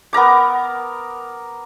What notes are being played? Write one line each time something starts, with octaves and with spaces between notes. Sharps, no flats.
B3 A#4 A#5 D6